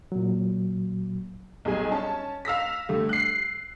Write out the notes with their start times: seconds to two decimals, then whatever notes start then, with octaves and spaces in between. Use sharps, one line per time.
0.12 A#2 F#3
1.65 B1 G3 G#4 G#5
1.92 C#4 A5
2.45 F5 E6 A#6 B6
2.89 D3 G3 A3
3.09 F#6 C7